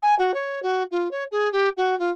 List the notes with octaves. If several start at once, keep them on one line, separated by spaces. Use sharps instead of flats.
G#5
F#4
C#5
F#4
F4
C#5
G#4
G4
F#4
F4